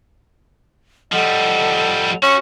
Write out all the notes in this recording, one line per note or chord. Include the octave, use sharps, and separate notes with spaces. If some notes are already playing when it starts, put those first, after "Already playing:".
F3 G3 A4 D#5 F#5
C#4 F#4